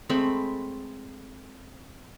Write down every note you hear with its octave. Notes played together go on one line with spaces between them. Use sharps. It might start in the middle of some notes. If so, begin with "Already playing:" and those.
G#3 A3 C4 B5